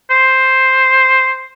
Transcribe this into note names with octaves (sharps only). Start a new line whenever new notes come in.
C5